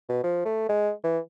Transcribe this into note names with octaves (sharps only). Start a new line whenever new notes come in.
B2
F3
A3
G#3
E3